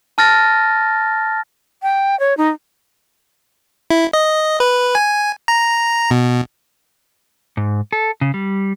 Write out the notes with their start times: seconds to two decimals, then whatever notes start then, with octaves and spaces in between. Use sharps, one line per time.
0.18 A5 F6 A6 A#6
1.83 G5
2.20 C#5
2.37 D#4
3.91 E4
4.13 D#5
4.60 B4
4.95 G#5
5.48 A#5
6.11 B2
7.57 G#2
7.93 A4
8.21 C#3
8.34 G3